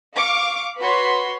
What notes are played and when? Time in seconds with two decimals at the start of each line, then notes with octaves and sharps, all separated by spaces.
0.15 F5 C#6 D6
0.80 F#4 B4 C#5 B5 C6